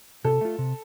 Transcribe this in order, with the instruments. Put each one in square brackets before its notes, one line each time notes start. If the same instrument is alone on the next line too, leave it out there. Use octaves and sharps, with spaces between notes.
[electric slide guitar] C3 [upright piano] A4
[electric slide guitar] A3 F4
C3